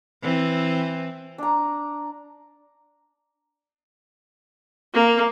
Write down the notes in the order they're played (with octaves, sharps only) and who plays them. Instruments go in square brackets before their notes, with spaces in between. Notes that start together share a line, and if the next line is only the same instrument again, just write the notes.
[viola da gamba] E3 C4
[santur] D4 A#5
[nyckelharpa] A#3